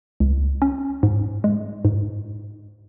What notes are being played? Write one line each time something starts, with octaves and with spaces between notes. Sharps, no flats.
C#2
C#4
G#2
G#3
G#2